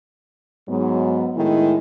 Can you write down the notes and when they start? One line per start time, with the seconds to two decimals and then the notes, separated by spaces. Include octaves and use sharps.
0.69 G#2 F#3 B3
1.36 A2 D#3 G#3 E4